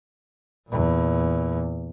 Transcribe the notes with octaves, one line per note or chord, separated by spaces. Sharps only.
E2 A#2